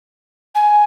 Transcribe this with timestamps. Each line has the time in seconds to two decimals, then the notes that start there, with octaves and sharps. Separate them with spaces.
0.55 G#5